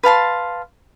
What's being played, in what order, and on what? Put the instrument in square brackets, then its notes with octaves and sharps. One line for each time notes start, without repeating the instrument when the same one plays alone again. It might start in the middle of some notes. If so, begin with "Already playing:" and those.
[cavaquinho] B4 F5 A5 C6